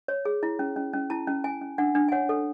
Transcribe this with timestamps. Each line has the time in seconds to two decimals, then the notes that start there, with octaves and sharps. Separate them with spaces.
0.08 C#5
0.25 G#4
0.43 E4
0.59 C#4
0.76 C#4
0.93 C#4
1.10 E4 A5
1.27 C#4
1.44 C#4 G#5
1.62 C#4
1.78 D4 F#5
1.95 D4
2.08 G#5
2.12 C#5 F#5
2.29 A4